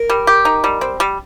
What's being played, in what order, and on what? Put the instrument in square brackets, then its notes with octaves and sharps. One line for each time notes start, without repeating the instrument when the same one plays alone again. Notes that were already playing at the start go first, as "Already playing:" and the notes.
Already playing: [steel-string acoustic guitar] A#4
[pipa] G3
G4
D#4
G3
C4
G3